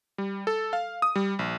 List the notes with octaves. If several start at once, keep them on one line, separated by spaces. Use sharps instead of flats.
G3
A4
F5
D#6
G3
A#1